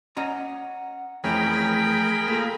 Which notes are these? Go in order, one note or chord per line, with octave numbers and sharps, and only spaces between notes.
C#4 D#5 F#5 A#5
F2 E3 A3 C#4 G#4 A#4 G5 B5
A#3 F4 A4